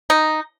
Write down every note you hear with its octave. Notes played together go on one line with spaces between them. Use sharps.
D#4